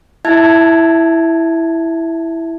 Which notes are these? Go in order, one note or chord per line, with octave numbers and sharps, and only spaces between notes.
E4 E5 A5 G#6